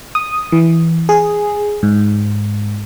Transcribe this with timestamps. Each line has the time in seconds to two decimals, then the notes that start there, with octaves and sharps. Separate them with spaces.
0.15 D#6
0.52 E3
1.09 G#4
1.83 G#2